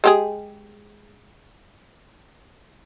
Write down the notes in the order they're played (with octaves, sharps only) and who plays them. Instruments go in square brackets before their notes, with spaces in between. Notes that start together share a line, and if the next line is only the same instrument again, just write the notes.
[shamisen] G#3 G4 G#4